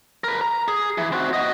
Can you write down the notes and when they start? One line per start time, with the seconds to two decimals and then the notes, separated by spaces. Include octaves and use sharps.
0.24 A#4 B4
0.41 A#5
0.68 G#4
0.98 E3
1.12 C4 F#4
1.33 F#4 D#5